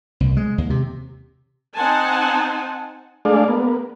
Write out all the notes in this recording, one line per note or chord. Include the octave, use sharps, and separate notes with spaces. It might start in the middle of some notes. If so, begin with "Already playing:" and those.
C2
G#3
D#2
C3
C4 D#4 C5 F#5 G#5 A5
G#3 A3 D4 G#4 D5 F5
A#3 B3